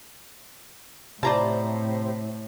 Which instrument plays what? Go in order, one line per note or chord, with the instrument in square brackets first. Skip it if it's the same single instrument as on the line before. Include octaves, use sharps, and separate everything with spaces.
[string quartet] A2 [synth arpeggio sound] C3 C5 [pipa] E4 F4 D5 [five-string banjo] A5 A#5